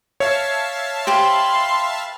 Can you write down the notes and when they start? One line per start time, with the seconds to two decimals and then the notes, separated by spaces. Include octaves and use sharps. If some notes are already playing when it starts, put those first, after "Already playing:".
0.20 C#5 E5 F5 A5
1.07 G4 B4 C5 C6